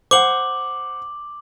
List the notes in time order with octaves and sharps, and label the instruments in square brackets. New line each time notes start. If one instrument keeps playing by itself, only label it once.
[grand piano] C5 F#5 [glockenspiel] D6 F#7